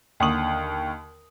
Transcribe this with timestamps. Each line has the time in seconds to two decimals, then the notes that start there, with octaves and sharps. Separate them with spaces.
0.20 D#2 D3 C#6 D#6 F#7